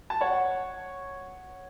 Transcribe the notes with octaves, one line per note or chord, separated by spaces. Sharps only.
A5
C#5 F#5